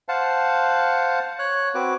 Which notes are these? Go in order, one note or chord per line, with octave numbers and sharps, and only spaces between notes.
C5 F5 F#5 A5
C#5 F#6
C4 F#4 B4 D6